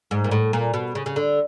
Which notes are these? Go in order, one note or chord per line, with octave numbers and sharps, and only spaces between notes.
G#2
A#2
A2
A#2
B2
C#3
C#3
D3